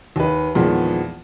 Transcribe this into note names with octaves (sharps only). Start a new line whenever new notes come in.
D#2 B4
E2 A#2 D#3 F3 G#3 B3